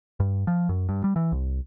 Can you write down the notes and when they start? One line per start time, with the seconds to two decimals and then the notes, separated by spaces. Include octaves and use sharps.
0.20 G2
0.47 F3
0.69 F#2
0.89 G2
1.04 G3
1.16 E3
1.32 C2